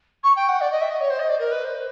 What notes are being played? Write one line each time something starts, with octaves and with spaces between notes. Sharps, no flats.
C#6
G5
F#5
D5
D#5
E5
D#5
C#5
C5
D#5
D5
A#4
B4
C5